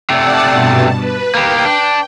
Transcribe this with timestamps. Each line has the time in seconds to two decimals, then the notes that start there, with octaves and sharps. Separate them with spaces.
0.10 C3 A3 D5 F#5 A5
0.49 G2 B2 A5
0.97 B4
1.35 A#3 G4 G5
1.65 D4